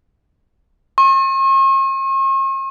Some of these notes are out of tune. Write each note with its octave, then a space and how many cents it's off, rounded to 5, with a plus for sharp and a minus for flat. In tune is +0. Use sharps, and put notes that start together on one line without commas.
C#6 -45